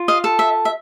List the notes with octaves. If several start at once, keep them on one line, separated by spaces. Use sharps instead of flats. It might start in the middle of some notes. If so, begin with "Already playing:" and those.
Already playing: F4
D#5 F5
A4
E5
E5